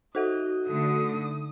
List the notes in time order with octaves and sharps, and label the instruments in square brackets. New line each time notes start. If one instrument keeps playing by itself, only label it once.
[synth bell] D#4 A4 E5 [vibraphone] F#4 [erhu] D#5
[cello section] D3 A3 [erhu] D#6